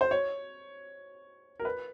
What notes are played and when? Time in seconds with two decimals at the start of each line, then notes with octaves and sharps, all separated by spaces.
0.01 C5
0.11 C#5
1.59 A#4
1.65 B4